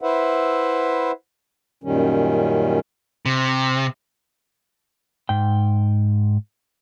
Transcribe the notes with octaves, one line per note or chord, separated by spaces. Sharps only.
E4 B4 C5 E5 F#5
F#2 A#2 D#3 G3 C#4
C3
G#2 G5